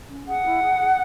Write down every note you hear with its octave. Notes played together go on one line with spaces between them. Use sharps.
C#4
G#4 F#5
E4
G#4
G#4